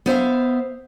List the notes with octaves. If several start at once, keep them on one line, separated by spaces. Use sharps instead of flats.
B3 C5 E5 F5